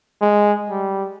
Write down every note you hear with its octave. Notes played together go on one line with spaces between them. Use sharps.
G#3
G3